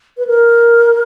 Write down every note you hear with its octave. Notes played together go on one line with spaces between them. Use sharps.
B4
A#4